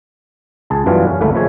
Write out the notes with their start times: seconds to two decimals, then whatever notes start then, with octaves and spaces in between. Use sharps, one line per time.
0.70 C#2 G#4 A5
0.86 F#2 E3 G3 B3 D4 F4
1.07 C#4
1.20 G1 C#2 A3 A#3 E4 E5
1.34 C#3 F3 G#3 C#5 E5